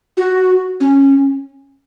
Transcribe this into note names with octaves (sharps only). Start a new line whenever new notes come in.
F#4
C#4